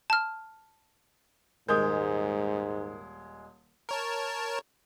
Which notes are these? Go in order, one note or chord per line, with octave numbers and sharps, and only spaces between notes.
A5 F6
D#1 G#2 G#3 A#4 D#6 G6
A#4 C#5 A5